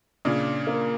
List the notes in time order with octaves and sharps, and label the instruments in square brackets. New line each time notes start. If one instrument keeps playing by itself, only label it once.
[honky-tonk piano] A#2 C#3 [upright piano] D4
[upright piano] A#3